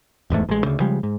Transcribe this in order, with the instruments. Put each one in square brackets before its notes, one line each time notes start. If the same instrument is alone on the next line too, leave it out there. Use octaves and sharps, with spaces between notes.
[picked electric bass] D1 E2 G#2 A3
A1 G#3
D2 C#3
C#3 F3 G3 G#3
G#2